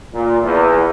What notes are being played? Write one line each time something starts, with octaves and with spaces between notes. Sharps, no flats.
A#2
E2